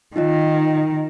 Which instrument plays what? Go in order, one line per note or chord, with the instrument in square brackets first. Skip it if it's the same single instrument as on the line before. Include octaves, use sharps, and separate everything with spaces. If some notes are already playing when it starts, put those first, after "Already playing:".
[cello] D#3 [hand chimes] D#4 F4 D#5